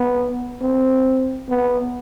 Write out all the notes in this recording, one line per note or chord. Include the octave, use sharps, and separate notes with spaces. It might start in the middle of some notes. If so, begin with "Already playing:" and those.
Already playing: B3
C4
B3